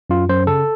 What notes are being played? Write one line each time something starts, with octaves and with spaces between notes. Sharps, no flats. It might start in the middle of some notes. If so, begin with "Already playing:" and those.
F#2 F4
F#2 C5
C#3 A4